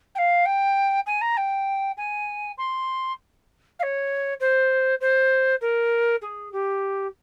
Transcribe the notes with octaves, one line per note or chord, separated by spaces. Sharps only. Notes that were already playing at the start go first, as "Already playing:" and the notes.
G5
F5
G5
G#5
A#5
G5
G#5
C6
F5
C#5
C5
C5
A#4
G#4
G4